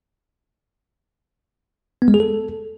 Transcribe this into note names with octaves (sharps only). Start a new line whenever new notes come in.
B3
G#3
G#4
A4